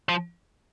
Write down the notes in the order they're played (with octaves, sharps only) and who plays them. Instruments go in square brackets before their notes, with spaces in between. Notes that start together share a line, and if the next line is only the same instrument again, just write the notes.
[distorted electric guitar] F3